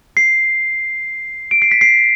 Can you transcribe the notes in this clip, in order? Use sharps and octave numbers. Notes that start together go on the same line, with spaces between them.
C7
D7
C7
B6
C7